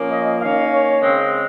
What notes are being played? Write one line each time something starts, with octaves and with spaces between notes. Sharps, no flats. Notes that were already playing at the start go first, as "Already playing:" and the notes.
Already playing: A#2 F3 A#3 C#4
D#5
D#3 A#3 C#4 F5
C#5
C#3 G#3 C4